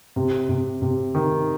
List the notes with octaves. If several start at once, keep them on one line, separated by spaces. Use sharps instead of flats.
C3
C3
C3
D#3